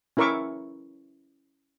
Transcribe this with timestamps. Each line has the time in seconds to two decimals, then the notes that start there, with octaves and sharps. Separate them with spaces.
0.17 C#4 E4 A#4 E5 C#6 D6